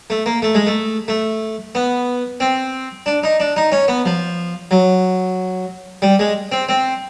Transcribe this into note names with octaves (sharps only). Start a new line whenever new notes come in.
A3
A#3
A3
G#3
A3
A3
B3
C4
D4
D#4
D4
D#4
C#4
B3
F3
F#3
G3
G#3
C4
C4